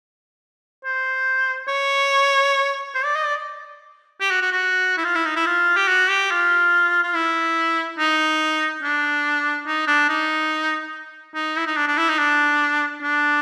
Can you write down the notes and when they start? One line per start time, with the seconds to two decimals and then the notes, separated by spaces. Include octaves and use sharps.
0.84 C5
1.68 C#5
2.95 C5
3.05 D5
3.15 D#5
3.25 D5
4.21 G4
4.31 F#4
4.42 F#4
4.52 F#4
4.97 E4
5.04 F4
5.15 E4
5.25 D#4
5.36 E4
5.46 F4
5.77 G4
5.88 F#4
6.10 G4
6.31 F4
7.03 F4
7.15 E4
7.98 D#4
8.83 D4
9.66 D#4
9.87 D4
10.09 D#4
11.35 D#4
11.57 E4
11.67 D#4
11.76 D4
11.87 D4
11.98 E4
12.09 D#4
12.18 D4
13.03 D4